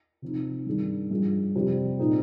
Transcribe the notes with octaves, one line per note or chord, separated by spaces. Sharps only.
C3 F3 C4 D#4
G2 D#3 G#3 D4
G2 F3 G#3
F2 C3 G3 C4
A#2 G#3 C4 D#4